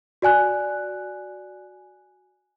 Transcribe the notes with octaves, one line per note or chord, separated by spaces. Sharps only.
F#4 D5 G#5 F#6